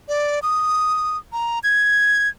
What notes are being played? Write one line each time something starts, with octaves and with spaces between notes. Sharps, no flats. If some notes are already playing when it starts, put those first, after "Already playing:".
D5
D#6
A#5
G#6